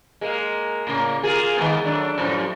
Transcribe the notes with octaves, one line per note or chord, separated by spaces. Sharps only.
G#3 A#3
A2 C#3 A#3
A#3 F4 G#4
D#3 G#3 B3
F#3 A3 D4
F#2 A2 F3